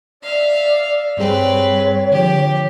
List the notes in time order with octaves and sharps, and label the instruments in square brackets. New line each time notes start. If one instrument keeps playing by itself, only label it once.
[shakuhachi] D5 [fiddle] E5 F5
[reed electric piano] G2 G3 G#4 [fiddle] C4 B4 [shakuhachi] C#5
[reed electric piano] D3 F3 [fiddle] G4